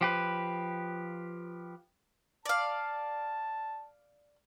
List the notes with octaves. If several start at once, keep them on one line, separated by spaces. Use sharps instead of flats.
F3 G4 B4
D5 F5 A5